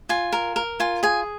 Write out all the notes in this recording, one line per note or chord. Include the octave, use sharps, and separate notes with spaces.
F4 G#5
A#4
A#4
F4 G#5
G#4 G#5